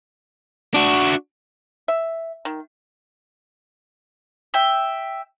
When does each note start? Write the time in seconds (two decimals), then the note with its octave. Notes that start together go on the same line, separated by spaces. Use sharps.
0.74 D4 F#4
1.88 E5
2.45 D#3
4.54 E5 G5